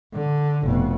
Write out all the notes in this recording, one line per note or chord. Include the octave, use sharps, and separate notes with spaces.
D3
F1 B2